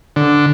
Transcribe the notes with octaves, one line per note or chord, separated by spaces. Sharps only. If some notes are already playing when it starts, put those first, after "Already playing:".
D3